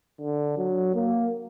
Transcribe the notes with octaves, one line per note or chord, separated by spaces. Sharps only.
D3
F#3
A#3